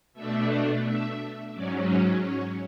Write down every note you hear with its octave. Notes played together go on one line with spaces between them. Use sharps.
B2 A3 D4 E5
E5
G#2 F#3 C#4 D5
C#5
C#5